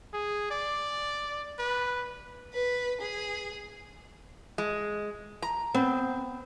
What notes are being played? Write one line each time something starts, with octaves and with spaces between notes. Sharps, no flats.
G#4
D5
B4
B4
G#4
G#3
A#5
B3 C4